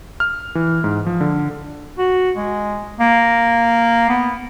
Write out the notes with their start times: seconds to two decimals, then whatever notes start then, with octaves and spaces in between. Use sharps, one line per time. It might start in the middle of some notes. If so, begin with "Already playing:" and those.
0.20 F6
0.55 E3
0.84 G#2
1.06 F3
1.21 D3
1.98 F#4
2.37 G#3
3.00 A#3
4.09 B3